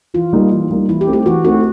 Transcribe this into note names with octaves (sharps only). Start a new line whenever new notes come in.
E3 F4
G3 A#3 D#4
E3
G3 A#3 D#4
E3 E4
G4
A3 C4 D#4
G4
E3 F#4
A3 C4 D#4 F#4